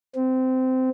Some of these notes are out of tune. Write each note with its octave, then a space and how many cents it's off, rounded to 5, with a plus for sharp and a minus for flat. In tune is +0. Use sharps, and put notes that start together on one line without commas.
C4 -20